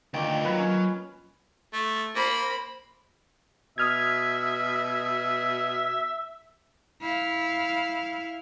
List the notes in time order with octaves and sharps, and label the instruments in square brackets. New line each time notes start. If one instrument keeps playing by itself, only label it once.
[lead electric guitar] D2 G5 [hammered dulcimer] A#2 D#3
[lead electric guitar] F#3 [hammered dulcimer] B4
[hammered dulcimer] C#4
[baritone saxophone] A3
[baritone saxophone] A#3 [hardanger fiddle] C5 B5
[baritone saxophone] B2 [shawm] E5 [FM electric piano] D#6 F6 G#6
[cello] E4 F5